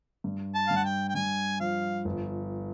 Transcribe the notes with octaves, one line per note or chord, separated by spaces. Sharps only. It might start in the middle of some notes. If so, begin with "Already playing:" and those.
G2
A5
G2 F5
F#5
G5
G5
G2 G#5
F3 F5
G1